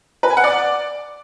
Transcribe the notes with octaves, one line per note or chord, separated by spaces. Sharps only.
B4
G#5
F#5
D5